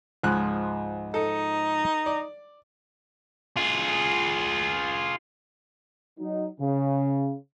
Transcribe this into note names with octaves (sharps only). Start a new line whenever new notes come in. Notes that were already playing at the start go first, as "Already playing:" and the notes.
C#2 G#2 F3 G#3 F#6
D#4 A4
D5
F4 G#4
F#3 D#4
C#3